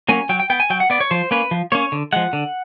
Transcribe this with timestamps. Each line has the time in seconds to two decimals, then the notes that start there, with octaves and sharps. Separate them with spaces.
0.09 F#3 A#3 C#4 G#5
0.29 F#3 G5
0.40 G5
0.50 B3 G5
0.60 G#5
0.70 F#3 G5
0.80 F#5
0.90 B3 D5
1.00 C#5
1.11 F3 C5
1.31 A#3 C#4 B4
1.51 F3
1.72 A#3 C#4 C#5
1.92 D3
2.13 F3 G#3 F#5
2.33 D3